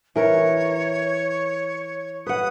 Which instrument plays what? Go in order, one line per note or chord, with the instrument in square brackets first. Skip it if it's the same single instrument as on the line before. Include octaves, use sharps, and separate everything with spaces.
[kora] E3 A#4 [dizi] C#5
[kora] B4 F#5 [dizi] D#6